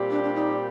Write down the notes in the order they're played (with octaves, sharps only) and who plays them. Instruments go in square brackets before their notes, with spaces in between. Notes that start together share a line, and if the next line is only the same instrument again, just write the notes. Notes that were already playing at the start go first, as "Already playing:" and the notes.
Already playing: [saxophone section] A#2 G3 C4 G4
[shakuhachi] D4
D4
D#4